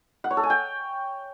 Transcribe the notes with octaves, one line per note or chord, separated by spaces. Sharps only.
F#5
C#5
A4
G#5
G5